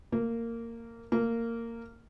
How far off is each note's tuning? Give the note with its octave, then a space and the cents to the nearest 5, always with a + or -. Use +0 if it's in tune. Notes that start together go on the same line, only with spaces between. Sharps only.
A#3 -15
A#3 -15